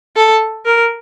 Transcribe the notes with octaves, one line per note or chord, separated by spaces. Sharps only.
A4
A#4